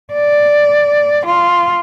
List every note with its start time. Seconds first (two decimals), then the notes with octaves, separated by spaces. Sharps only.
0.13 D5
1.26 F4